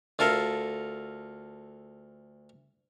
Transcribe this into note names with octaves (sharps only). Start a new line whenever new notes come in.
D2 F4 A4 A#4